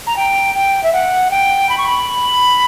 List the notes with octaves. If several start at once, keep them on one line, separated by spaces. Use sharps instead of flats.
A#5
G5
G5
E5
F#5
G5
B5
C#6
B5